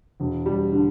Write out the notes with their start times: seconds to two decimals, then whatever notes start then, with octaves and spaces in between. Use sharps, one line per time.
0.20 E1
0.46 G3
0.72 D3